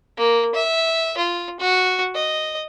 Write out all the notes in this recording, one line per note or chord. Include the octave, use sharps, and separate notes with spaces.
A#3
E5
F4
F#4
D#5